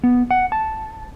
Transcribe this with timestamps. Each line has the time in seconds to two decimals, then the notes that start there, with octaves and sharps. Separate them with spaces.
0.04 B3
0.31 F#5
0.52 A5